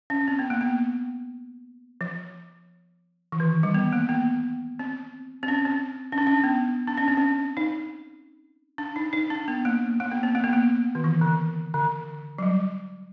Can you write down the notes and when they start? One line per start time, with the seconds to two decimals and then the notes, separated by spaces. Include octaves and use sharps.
0.10 C#4
0.28 C4
0.39 B3
0.50 A#3
0.61 B3
2.01 F3
3.32 E3
3.40 D#3
3.63 G3
3.74 B3
3.93 A#3
4.09 B3
4.79 C4
5.43 C4
5.48 C#4
5.65 C4
6.12 C#4
6.18 D4
6.27 C#4
6.44 B3
6.87 D4
6.97 C#4
7.08 C4
7.17 C#4
7.57 D#4
8.78 D4
8.96 D#4
9.13 D#4
9.30 D4
9.48 B3
9.65 A#3
10.00 A#3
10.12 B3
10.23 C4
10.35 A#3
10.44 B3
10.53 A#3
10.95 D#3
11.04 E3
11.21 D3
11.74 D3
12.38 F#3
12.43 G3